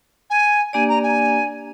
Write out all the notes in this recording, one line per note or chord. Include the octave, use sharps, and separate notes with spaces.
G#5
A#3 D4 G4 D5 G#5
A#5
G#5